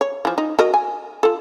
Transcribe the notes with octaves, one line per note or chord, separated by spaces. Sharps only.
C#5
E3 F3
D#4
F#4 A#4 D#5
G#5
F4 A4